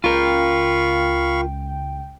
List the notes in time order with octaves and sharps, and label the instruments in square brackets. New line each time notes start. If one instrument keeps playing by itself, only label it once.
[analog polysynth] C#2 G5 [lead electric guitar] F4 A#4 [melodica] F5 B5 C#6